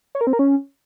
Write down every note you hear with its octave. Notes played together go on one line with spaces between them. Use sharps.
C#5
A#4
C4
A#4
C#4